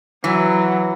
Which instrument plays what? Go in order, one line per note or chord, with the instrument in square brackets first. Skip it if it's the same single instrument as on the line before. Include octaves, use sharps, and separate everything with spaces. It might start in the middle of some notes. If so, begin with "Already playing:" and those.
[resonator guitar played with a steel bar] E3 [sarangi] F#3